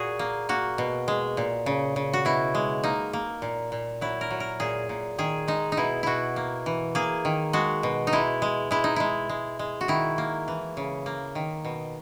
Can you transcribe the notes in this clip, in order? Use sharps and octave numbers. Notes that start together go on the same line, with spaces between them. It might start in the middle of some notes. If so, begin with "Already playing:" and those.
Already playing: A#2 F#4 G#4
A#3
A#3 F#4
B2
G#3
A#2
C#3
C#3
F#4
B2 E4
G#3
A#3 D#4
A#3
A#2
A#2
F#3 E4
A#4
F#3
A#4
A#2 G#4
A#2
D#3 G#4
G#3 D#4
D#4
B2 E4
B2 E4 F#4
A#3
E3
A#3 G#4
D#3
G#3 F#4
B2
D#4
G#3 E4
G#3
G#3 E4
D#4
G#3 E4
G#3
G#3
F#4
D#3 E4
A#3
E3
C#3
A#3
D#3
B2